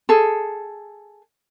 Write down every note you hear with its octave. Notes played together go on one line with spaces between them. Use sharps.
G#4 A4